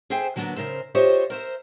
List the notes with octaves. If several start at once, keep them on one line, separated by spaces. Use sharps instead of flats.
G#4 A4 C5 E5 G5 G#5
D3 F#3 A#3 B3 D4
C#3 A#4 C5 E5
F4 G4 C5 C#5 D#5 E5
A#4 C5 E5